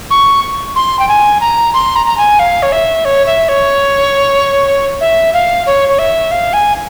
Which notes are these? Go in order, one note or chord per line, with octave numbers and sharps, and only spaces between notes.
C#6
C6
G5
G#5
A#5
C6
A#5
A#5
G#5
F5
C#5
E5
C#5
E5
C#5
E5
F5
C#5
C#5
E5
F5
G#5